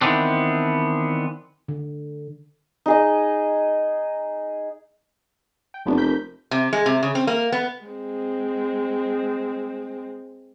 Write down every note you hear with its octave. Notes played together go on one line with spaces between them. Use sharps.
D#3 E3 B3 C4 D4
D3
D#4 G#4 D#5
G5
F1 F#2 B3 D4
A#4 G6 B6
C3
G#3
C3
C#3
C4
A#3
B3
G#3 C4